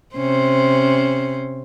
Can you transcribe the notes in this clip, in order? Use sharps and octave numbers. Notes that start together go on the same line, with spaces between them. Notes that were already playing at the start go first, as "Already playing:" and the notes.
C3 C#4 C5